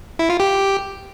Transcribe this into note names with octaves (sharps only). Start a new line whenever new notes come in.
E4
F4
G4